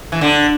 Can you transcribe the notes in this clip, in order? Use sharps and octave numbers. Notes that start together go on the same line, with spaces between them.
E3
D3